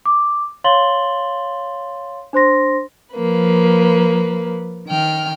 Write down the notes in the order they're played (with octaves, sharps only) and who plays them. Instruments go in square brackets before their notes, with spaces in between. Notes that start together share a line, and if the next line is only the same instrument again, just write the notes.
[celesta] D6
C#5 F5 C6 A6 F#7 G7
D4 C5 C6 A#6
[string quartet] F3 A#3 B4
D#3 G5 F6